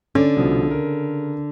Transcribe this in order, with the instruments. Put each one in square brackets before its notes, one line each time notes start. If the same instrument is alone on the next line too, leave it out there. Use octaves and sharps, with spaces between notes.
[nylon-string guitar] D3 [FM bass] C#4 [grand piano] D5
[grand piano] C2 B2 F3
C#3 A#4